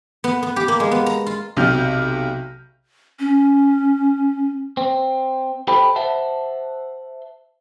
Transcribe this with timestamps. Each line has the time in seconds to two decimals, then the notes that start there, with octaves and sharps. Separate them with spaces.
0.24 B3
0.43 B3
0.56 G4
0.68 A#3
0.80 G#3
0.91 B3
1.06 A#5
1.26 F4
1.57 B1 C3 F6 G6
3.19 C#4
4.77 C4
5.68 G4 A4 C5 G5 B5
5.96 C5 E5 F#5 A5